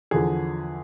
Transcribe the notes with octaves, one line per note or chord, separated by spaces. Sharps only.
E2 D3 F3 G#4